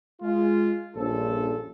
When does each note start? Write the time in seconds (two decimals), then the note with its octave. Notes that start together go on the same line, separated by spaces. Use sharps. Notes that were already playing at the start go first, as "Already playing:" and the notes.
0.22 G#3 F4
0.95 A#1 G2 F3 C#4 A4